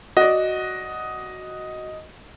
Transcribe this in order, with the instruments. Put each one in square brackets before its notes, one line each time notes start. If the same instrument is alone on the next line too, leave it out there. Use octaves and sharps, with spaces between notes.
[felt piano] F#4 D5 [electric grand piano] D#5